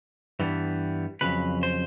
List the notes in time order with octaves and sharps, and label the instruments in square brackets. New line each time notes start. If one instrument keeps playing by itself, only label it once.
[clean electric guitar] G2 E3 G3 B3
F2 C#3 F#3 B4
C5